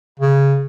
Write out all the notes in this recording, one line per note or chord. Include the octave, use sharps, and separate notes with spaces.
C#3